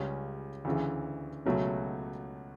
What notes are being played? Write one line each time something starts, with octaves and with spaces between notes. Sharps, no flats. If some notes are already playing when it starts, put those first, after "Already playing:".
Already playing: C#2 C#3 G3 C#4
D2 C#3 E3
C#2 B2 F#3 A3 C#4